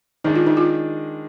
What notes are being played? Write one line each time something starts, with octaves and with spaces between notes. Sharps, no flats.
D#3 G#3 D4 D#4
F4
D#4
F4